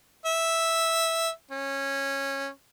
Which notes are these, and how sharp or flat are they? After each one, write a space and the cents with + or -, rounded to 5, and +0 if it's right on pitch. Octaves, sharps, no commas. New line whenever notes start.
E5 -5
C#4 -15